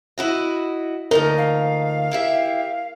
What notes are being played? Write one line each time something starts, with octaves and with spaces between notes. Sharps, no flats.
E4 F#4 D#5
D2 F3 D#4 A#4
F5
E4 G4 E5